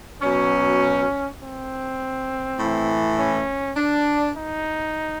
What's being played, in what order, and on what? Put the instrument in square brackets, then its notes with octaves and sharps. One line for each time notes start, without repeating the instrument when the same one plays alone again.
[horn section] B2 F#3 C#4
C4
A2 E3
C#4
D4
D#4